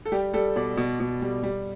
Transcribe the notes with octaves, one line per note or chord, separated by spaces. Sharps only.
A4
G3 G4
G3 A4
B2 D5
B2
B2
G3
G3